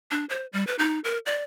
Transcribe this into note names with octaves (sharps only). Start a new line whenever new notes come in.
D4
C5
G3
B4
D#4
A#4
D5